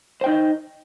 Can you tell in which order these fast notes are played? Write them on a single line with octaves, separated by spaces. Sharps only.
C5 G5 D#4 D5 D#5